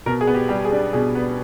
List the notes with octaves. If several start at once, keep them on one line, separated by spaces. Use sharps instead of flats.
B2 A#4
G#4
B3
G4
G3 G4
G#4
D4
B2 G#4
B3